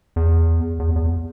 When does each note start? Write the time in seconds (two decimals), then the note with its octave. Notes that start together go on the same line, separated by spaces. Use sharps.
0.16 E2
0.79 E2
0.96 E2